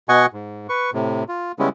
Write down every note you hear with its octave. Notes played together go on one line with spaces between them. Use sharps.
B2 D#5 F#5 G#5 C#6
G#2
B4 C#6
A2 C3
F4
C#3 G3 G#3 B3 C#4 E4